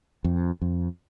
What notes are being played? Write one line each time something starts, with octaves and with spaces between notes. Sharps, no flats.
F2
F2